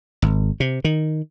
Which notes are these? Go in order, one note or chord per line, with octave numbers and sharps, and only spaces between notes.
G#1
C3
D#3